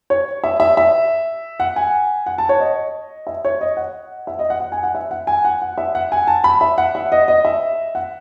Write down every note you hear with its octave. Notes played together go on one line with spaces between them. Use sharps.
C#5
E5
E5
E5
F#5
G#5
F#5
A5
C#5
D#5
E5
C#5
D#5
F#5
E5
D#5
F#5
F#5
G#5
F#5
E5
F#5
G#5
F#5
F#5
E5
F#5
G#5
A5
B5
E5
F#5
E5
D#5
D#5
E5
F#5